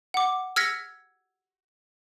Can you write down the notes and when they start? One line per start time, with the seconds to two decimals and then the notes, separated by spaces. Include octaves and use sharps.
0.14 F#5 D6
0.56 E6 F6 G#6 A#6 B6 C#7